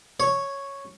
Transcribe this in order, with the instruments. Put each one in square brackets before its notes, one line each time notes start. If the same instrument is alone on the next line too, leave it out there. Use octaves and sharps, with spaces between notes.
[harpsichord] C#5